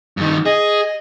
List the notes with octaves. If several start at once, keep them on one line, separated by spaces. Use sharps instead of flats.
G2 D#3
G#4 D#5